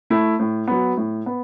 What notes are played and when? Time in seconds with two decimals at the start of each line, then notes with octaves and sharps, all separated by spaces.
0.10 A3 E4
0.40 A2
0.68 F#3 B3
0.97 A2
1.26 B3